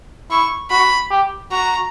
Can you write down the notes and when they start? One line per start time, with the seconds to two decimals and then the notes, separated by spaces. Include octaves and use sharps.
0.30 E4 C#6
0.70 F#4 B5
1.11 G4
1.51 F#4 A#5